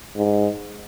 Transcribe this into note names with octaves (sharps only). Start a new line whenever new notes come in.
G#2